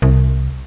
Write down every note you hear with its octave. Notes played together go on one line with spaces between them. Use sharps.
C2